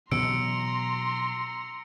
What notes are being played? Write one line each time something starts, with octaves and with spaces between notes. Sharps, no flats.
B2 E3 F#3 A#5 C6 E6 C#7 D7